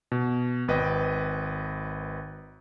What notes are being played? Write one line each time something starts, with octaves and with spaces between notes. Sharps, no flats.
B2
G#1 B4 D#5 G5